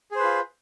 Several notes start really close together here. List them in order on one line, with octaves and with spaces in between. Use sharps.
G#4 C5 B4 F4